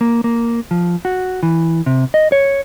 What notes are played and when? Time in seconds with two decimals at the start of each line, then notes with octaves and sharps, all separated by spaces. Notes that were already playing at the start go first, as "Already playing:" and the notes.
0.01 A#3
0.24 A#3
0.71 F3
1.05 F#4
1.43 E3
1.86 C3
2.14 D#5
2.32 C#5